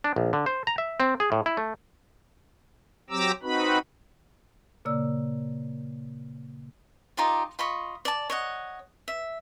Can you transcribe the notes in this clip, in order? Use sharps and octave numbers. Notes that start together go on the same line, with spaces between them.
D4
A#1
D3
C5
A#5
E5
C4
G#4
A2
E4
A3
F#3 C4 G4 A#5 D6 E6
C4 D#4 F#4 B4 B5
A#2 C#3 A#3 D5 E6
D#4 F4 G4 D5
F4 D#5 B5 C#6
D5 A5
C#5 D#5 F#5
E5